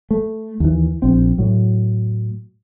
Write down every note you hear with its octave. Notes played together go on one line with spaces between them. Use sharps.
A3
D#2 E3
A#1 C4
A2 F#3